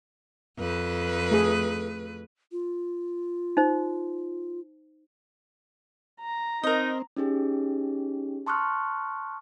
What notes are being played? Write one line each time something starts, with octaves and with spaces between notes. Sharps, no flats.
F2 B4
A3 G#4
F4
D#4 C5
A#5
C4 D#4 A#4 D#5
C#4 D#4 G4 G#4
A5 C6 C#6 D#6 F6 F#6